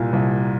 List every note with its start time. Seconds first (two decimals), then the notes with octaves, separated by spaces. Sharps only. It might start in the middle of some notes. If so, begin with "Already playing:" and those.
Already playing: C2 A#2
0.13 C2